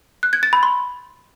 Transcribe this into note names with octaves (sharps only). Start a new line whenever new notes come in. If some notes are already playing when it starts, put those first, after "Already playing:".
F#6
G#6
A6
B5
C6